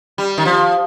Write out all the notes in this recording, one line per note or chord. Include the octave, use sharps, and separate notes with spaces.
G3
D#3
F3